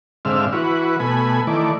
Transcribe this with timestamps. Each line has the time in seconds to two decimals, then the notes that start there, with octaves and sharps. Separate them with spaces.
0.25 G#2 D3 C4 E5 F5
0.53 E3 F#4 B4
1.00 B2 A3 G#5 B5
1.47 D#3 E3 A3 D5